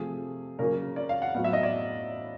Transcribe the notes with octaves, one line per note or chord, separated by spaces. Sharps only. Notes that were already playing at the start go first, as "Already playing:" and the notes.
Already playing: C3 F3 A3 G#4
C#3 F#3 A#3 C#4 A#4
D5
F5
F#5
A2 F#3 B3 F5
E5
D#5
D5